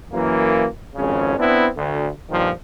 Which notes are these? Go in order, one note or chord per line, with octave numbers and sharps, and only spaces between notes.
F#2 E3 A#3
G#1 F2 C#3 C#4
B3 C4 D4 E4
D2
G2 A#2 D#3 F3